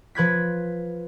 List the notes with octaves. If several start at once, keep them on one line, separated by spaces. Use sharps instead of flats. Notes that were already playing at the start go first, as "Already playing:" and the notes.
F3 B4 G#6 B6